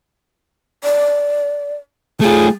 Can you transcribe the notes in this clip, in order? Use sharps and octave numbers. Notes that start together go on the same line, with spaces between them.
D5
A3 F4 G#4